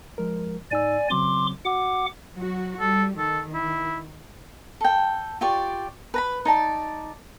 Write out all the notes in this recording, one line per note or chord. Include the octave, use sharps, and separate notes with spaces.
F3 G#3 A#4
G#2 D#4 D5 G#5 E6
C#3 F#3 C4 C6 D6
F#4 F#5 D6
F#3 F#4
G3 A4
D#3 A4
E4
A4 G5
F4 G4 D5 C#6
B4 A#5 B5
D#4 D5 A5